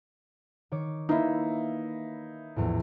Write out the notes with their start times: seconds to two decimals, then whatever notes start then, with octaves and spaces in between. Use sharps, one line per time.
0.71 D#3 C#5 D6
1.09 A#3 D#4 E4 B4 E5
2.56 A#1 E2 A2